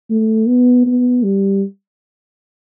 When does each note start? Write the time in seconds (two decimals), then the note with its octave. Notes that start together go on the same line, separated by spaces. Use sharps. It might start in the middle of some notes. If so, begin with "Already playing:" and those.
0.10 A3
0.48 B3
0.86 B3
1.23 G3